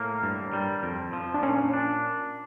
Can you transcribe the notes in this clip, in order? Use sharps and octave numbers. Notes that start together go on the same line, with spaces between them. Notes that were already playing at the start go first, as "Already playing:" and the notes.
Already playing: A2 A#3
G2
G3
F2
F3
D4
A#2 C#4
D4